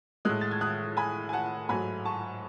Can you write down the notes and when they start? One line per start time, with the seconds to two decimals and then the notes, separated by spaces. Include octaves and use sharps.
0.25 A2 G#3 D#6 F#6
0.41 A6
0.51 G#6
0.61 D#6 F#6
0.97 G#5 B5
1.29 G#5
1.33 F#5 A5
1.69 G#2 F#3 A3 G#5 B5
2.05 A5 C#6